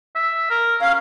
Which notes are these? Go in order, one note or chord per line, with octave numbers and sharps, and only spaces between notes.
E5
A#4
C#4 F5